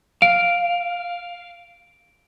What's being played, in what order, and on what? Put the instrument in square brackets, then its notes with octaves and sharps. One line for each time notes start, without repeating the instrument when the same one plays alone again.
[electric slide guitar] F5 [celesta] D7